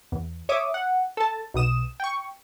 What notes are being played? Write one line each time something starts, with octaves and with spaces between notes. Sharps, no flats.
E2
C#5 E5 D6 D#6
F#5
A4 A5
B1 B2 D#6 E7
G5 C#6